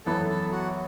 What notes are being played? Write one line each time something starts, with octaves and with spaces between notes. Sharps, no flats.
F#2 E3 B3 A4
A4
F#4